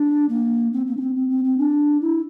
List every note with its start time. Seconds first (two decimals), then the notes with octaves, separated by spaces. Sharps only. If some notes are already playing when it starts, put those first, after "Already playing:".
Already playing: D4
0.29 A#3
0.73 C4
0.86 A#3
0.97 D4
1.01 C4
1.16 C4
1.30 C4
1.45 C4
1.58 D4
2.01 E4